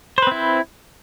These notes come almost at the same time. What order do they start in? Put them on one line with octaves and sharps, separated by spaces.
C5 B4 C4 E4